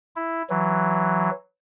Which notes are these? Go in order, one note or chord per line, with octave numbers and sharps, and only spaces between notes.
E4
E3 F#3